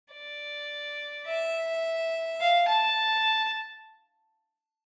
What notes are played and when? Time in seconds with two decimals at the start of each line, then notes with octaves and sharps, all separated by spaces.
0.14 D5
1.28 E5
2.41 F5
2.68 A5